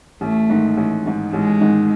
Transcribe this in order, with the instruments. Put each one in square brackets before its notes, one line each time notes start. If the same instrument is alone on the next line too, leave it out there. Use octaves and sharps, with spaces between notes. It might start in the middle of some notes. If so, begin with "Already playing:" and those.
[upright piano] A1 [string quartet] A3
[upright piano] G#2 D#3
A1
G#2 D#3
[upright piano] A1 [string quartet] G#3
[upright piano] G#2 D#3